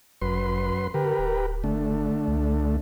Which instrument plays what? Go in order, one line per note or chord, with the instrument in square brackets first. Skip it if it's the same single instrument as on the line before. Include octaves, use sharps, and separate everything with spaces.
[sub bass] G1 [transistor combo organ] F#2 B4 C6
[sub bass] D3 [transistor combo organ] G4 A#4 B4
[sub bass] D1
[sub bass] F#1 [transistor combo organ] D3 A3
[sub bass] C#2